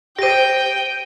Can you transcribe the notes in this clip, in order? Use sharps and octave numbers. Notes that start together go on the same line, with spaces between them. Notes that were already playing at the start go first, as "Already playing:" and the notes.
G4 C5 G5 A#6 D#7